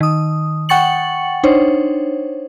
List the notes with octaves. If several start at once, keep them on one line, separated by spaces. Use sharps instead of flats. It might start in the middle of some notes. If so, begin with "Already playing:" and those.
D#3 D#6
F#5 G5 C#6 A6 C#7 F#7
D4 D#4 C5 C#5